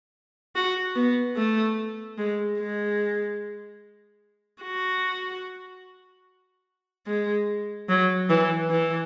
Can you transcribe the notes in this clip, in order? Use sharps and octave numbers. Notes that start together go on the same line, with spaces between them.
F#4
B3
A3
G#3
G#3
F#4
G#3
F#3
E3
E3